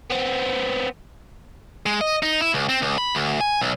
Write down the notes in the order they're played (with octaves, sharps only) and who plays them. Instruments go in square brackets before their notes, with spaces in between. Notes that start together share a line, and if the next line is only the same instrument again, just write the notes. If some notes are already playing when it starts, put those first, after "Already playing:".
[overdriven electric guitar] B3 C4
[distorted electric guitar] G#3
D#5
D#4
E4
C#2
C4
C#2
B5
D2
G#5
B1